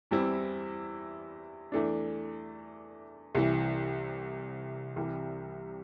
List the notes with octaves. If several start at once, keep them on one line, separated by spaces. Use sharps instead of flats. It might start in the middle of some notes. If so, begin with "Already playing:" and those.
E2 E3 G3 C4 E4
E2 E3 A3 D4
C2 C3 E3
C2 C3 E3 G3